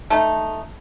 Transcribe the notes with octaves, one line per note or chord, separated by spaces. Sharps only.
A3 D#4